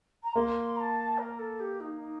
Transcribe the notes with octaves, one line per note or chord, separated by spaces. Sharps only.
A#5
A#3 C6
A#5
A5
A#4
A4
G4
D#4
D#4